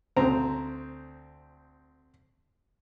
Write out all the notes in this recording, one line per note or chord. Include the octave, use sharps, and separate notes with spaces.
D2 C4 A#5